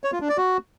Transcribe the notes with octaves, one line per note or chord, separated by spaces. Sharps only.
C#5
F4
D4
D5
F#4